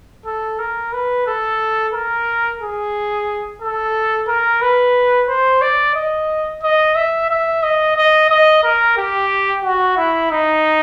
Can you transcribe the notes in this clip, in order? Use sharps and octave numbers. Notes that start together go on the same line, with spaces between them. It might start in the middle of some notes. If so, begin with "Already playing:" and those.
A4
A#4
B4
A4
A#4
G#4
A4
A#4
B4
C5
D5
D#5
D#5
E5
E5
D#5
D#5
D#5
A#4
G4
F#4
E4
D#4